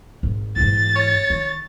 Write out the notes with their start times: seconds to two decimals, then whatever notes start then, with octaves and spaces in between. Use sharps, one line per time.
0.23 G#1
0.56 G#2 E3 A6
0.95 C#5
1.30 D#3